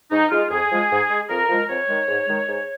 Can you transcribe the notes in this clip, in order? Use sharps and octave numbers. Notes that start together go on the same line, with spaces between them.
G#2 D#4
G#3 F4
F2 G#4
F3 G#3
G#2
G#3
F2 A#4
F3 G#3
F2 C#5
D#3 G#3
G#2
D#3 G#3
G#2